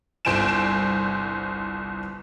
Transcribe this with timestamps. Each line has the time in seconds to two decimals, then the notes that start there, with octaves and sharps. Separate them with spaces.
0.25 G1 C2 C5 G#5 D7 E7